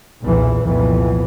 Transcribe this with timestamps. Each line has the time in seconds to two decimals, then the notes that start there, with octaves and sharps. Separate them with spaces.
0.22 B1 E2 A#2 E3
0.66 C2 F2 A#2 E3 B3